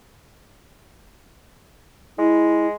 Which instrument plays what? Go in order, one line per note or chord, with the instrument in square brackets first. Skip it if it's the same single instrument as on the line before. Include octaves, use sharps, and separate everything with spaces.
[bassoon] G#3 [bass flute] E4